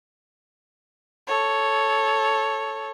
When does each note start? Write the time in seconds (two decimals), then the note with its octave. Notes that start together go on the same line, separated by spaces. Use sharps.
1.27 A4 C#5